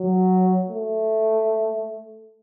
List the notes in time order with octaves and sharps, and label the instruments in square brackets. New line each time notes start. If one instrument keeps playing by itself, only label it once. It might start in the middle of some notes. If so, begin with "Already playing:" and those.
Already playing: [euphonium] F#3
A3